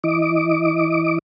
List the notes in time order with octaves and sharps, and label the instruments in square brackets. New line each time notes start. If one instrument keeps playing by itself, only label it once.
[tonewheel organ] E3 D#5 D6